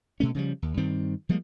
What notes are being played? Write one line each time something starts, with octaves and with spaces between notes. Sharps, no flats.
B2 A3 C#4
C#3 F3 G3
D#2
G2 D#3 G3 C4
F3 G3 G#3 A#3